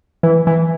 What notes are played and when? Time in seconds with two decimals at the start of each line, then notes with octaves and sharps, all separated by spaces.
0.23 E3
0.47 E3